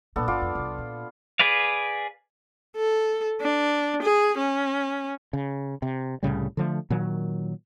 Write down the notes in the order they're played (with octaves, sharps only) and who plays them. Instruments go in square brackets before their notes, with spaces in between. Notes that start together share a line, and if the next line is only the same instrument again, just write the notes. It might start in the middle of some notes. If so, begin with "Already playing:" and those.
[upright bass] A#2 A#3 [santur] B3 D4 A4
[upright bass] G1 [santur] B3 F4 D6
[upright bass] F2
C2 F2
A#2
[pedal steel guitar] G#4 B4 D5 F5
[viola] A4
D4
G#4
C#4
[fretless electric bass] C#3
C3
C2 A2 C#3 G3
D3 F3 A3
A#2 D#3 F#3